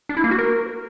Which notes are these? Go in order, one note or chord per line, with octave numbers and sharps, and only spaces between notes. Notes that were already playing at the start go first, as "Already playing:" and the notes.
D4
E4
A#3
F#4
A#4